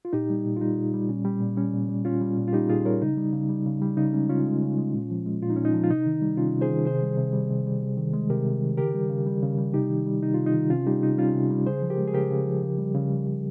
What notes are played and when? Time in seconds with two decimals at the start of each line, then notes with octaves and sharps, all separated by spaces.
0.05 F4
0.13 A#2 D#4 G4
0.30 G3
0.45 A#2
0.57 F4
0.61 G3 D#4
0.78 A#2
0.94 G3
1.09 A#2 C#4
1.25 G3
1.41 A#2
1.57 G3 C#4
1.74 A#2
1.89 G3
2.05 A#2 C#4 F4
2.21 G3
2.37 A#2
2.48 F4
2.53 G3 D#4 G4
2.70 A#2 F4 G#4
2.85 G3 A#4 C#5
3.02 C#3 D#4
3.17 G3
3.33 C#3
3.49 G3
3.66 C#3
3.82 G3
3.97 C#3 D#4
4.13 G#3 C#4
4.29 C#3 C#4 F4
4.46 G#3
4.62 C#3
4.78 G#3
4.94 A#2
5.10 F3
5.26 G#3
5.42 A#2 F4
5.50 D#4
5.56 A#2 C#4
5.65 D#4
5.74 F3
5.84 F4
5.90 C3 D#4
6.06 D#3
6.22 G3
6.37 C3 C#4 F4
6.53 C3
6.61 G#4 C5
6.70 D#3
6.85 C3 G#4 C5
7.02 G3
7.18 C3
7.33 G3
7.49 C3
7.67 G3
7.82 C3
7.97 D#3
8.13 G#3
8.30 C3 G4 A#4
8.45 C3
8.61 D#3
8.77 C#3 G4 A#4
8.95 G3
9.10 C#3
9.27 G3
9.43 C#3
9.58 G3
9.74 C3 D#4 G4
9.90 D#3
10.06 G3
10.22 C3 D#4
10.34 C3 F4
10.46 D#4
10.54 D#3
10.70 C3 C#4 F4
10.87 G3 D#4 G4
11.03 C3 D#4
11.18 G3 C#4 F4
11.35 C3
11.51 G3
11.66 C#3 G#4 C5
11.82 F3
11.90 G4 A#4
11.98 G#3
12.08 G#4
12.14 C#3 G4 A#4
12.31 C#3
12.46 F3
12.62 C#3
12.78 G3
12.95 C#3
13.11 G3
13.27 C#3